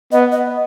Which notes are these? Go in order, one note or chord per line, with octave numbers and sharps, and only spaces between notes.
B3 D#5
D#5